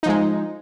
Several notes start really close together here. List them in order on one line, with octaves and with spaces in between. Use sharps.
D#4 F3 G#3